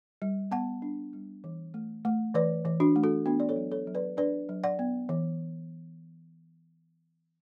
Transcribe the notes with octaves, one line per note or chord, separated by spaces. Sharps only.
G3
B3 F#5 A5
D4
G3
E3
A3
A3
E3 B4 D5
E3
D4 F#4
A3
F#4 A4
B3 D4 F#4
D5
A4 C#5
F#3
A4 C#5
F#3
B4 D5
D4 B4 D5
F#3
D5 F#5
B3
E3